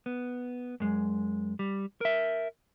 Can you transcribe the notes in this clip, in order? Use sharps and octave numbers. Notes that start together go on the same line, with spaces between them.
B3
F#2 G#3
G3
A#4 E5